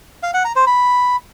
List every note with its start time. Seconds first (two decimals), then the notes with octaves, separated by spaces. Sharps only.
0.23 F5
0.34 F#5
0.45 A#5
0.56 C5
0.67 B5